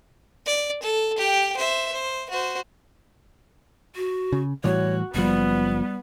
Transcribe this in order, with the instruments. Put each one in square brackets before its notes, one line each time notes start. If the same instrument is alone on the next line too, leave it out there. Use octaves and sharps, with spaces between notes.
[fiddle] D5
A4
G4 G5
C5 E5
C5
F#4 C5
[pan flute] F#4
[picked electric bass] C#3
[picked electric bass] A2 E3 G3 [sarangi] F#4 [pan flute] C#5
[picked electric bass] F#1 F3 [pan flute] G3 [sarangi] B3